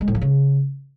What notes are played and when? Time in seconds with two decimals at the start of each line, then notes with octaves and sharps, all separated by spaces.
0.01 G#3
0.08 A2
0.15 F3
0.21 C#3